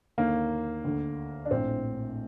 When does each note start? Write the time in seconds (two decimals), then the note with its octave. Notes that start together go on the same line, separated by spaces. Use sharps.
0.18 D#2 D3 A#3
0.84 D2 D3
1.45 D4
1.51 A#1 A2 C4